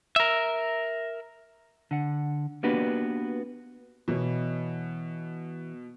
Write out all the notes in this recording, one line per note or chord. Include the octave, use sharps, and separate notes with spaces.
A#4 E5
D3 F#5
A#3 B3 D4 F#4 G4 B4
B2 E3 B3 C#5